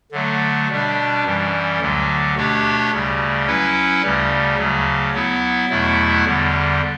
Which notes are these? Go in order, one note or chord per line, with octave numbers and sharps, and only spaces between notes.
D3 F#3 A3
B2 G3 D4
F#2 E3 G3
D2 D3 F#3
B2 A3 D4 G4 C#5
D2 C#3 G3
F#3 C#4 E4 B4
D2 C#3 G3
D2 C#3 F#3
F#3 B3 E4
E2 B2 F#3 A3 E4
E2 D3 G3